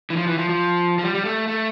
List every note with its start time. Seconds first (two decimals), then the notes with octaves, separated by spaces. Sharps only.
0.10 E3
0.16 F3
0.27 E3
0.38 F3
0.49 F3
0.99 F3
1.03 G3
1.15 G3
1.25 A3
1.48 A3